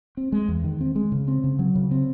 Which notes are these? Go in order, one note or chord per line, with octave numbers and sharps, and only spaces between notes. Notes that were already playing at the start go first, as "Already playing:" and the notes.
C4
G#3
E2
D#3
C4
G#3
C#3
C4
C#3
F#3
C#3
C4